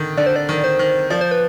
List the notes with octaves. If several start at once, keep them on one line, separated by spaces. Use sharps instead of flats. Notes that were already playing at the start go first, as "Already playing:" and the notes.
Already playing: D3 D#3
D3 D5
C5
D5
D#3
C5
D#3
F3 D5
C5
B4